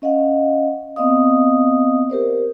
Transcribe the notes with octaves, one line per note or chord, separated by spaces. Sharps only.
C#4 D#5 F5 F#5
B3 C4 D5 D#5 F5 D#6
G4 A#4 C5 D5